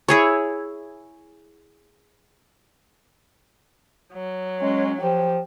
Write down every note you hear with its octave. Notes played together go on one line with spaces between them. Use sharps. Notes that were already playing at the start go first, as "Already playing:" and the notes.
E4 G#4 C#5
F#3
G#3 C#4
F3 G4